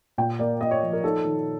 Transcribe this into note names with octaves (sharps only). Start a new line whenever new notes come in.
A#2 G5
A#3 D5
A#3 D#5
C#5
F3
A#4
D#4 A4
D#3